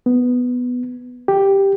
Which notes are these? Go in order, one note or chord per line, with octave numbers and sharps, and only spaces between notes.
B3
G4